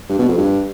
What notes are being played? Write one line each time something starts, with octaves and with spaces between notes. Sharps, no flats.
G2
B2
F2
G2